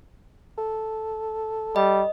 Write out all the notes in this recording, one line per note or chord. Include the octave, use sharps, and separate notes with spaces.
A4
G3 D#5